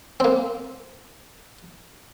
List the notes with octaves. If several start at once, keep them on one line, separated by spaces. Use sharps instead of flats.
A#3 C4